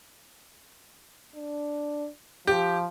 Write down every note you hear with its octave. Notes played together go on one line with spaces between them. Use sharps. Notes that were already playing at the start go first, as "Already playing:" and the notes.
D4
F3 G4